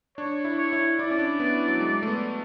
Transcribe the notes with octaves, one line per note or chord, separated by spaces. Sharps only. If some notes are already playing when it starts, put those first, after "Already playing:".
D4 C#5
E4
C#5
E4
E4 D5
C#4
D4
B3
F#3
G#3
A3
B3